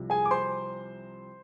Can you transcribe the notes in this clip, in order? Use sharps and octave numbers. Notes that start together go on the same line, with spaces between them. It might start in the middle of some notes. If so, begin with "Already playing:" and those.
Already playing: C2 C3 F3
G#4 G#5
D6
C5 C6